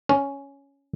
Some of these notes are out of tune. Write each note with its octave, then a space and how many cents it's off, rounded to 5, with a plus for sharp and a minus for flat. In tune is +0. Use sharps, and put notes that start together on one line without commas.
C#4 +5